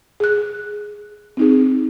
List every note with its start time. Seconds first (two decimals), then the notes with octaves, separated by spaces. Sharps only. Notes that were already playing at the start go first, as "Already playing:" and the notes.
0.20 G#4 F#6
1.37 C4 D#4 G#4